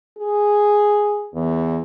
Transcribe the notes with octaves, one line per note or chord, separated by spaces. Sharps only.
G#4
E2